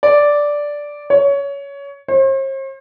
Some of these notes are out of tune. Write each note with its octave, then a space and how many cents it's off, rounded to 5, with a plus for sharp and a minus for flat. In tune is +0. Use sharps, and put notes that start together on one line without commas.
D5 -5
C#5 +20
C5 +45